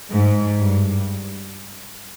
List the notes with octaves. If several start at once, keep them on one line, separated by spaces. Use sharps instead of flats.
G#2
G2